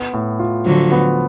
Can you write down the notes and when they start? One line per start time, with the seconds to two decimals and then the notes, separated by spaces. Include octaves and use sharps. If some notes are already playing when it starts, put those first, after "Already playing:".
Already playing: B3
0.13 A2
0.39 F4
0.66 D3 F3 F#3
0.92 B3